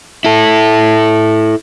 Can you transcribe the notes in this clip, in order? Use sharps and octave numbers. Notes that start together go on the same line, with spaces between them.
E4 A4